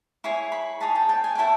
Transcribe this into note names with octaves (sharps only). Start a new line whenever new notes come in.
E4 G#4 C#5 C#6
B5 C#6
D#4 G#4 C#5 A5 B5
G5 A5
G5 A5
G#5
E4 A4 C#5 G5